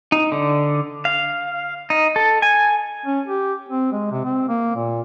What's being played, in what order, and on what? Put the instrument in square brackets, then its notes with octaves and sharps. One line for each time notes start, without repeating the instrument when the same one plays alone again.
[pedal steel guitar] D#4
D3
F5
D#4
A4
G#5
[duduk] C#4
G4
C4
G#3
C3
C4
A#3
A#2